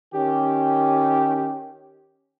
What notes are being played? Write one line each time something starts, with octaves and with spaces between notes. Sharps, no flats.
D#3 C#4 G4